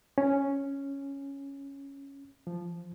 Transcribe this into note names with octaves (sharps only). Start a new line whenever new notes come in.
C#4
F3